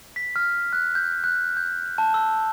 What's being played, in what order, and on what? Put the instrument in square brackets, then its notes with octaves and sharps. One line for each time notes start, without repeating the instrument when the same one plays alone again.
[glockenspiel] B6
F6
F#6
G6
F#6
G6
A5
E6